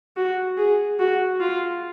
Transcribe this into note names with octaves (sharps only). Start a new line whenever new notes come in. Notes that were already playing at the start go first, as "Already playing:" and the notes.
F#4
G#4
F#4
F4